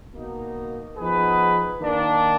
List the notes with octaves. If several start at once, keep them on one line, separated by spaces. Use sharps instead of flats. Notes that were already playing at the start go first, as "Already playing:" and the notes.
B2 A#3 D#4
F3 B3 D#4 G#4 B4
D#3 A#3 D4